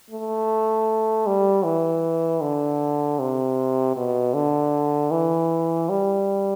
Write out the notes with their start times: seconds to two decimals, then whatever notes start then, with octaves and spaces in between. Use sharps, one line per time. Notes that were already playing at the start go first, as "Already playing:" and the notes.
0.11 A3
1.27 G3
1.64 E3
2.42 D3
3.19 C3
3.96 B2
4.34 D3
5.11 E3
5.89 G3